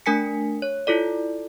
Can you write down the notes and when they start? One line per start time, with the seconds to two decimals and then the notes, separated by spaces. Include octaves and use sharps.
0.06 A3 D4 A#4 G#5 B6 C#7
0.62 C#5
0.87 E4 F4 A4 D5